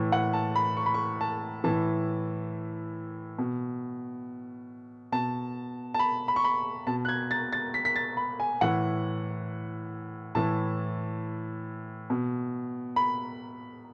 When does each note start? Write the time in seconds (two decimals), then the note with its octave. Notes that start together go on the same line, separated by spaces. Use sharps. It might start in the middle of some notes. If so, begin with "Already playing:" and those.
Already playing: A2 E3
0.12 F#5
0.33 A5
0.56 B5
0.77 C#6
0.86 B5
0.94 C#6
1.21 A5
1.64 A2 E3 A5
3.38 B2
5.12 B2 A5
5.94 A5
5.99 B5
6.28 B5
6.36 C#6
6.44 B5
6.87 B2 A5
7.05 F#6
7.09 G#6
7.31 A6
7.53 A6
7.74 B6
7.85 B6
7.96 A6
8.17 B5
8.40 G#5
8.61 A2 E3 F#5
10.35 A2 E3 A5
12.10 B2
12.96 B5